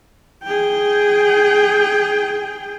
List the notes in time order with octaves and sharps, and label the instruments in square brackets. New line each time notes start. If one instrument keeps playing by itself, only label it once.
[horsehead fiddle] G#4 G5